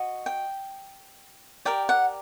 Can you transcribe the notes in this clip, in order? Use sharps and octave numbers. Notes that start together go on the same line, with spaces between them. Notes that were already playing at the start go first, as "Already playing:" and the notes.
Already playing: F#4 D#5
G5
G4 A#4 D5 G5
F#5